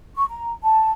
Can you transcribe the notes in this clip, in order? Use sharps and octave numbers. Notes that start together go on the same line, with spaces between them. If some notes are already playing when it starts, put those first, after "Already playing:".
C#6
A#5
A5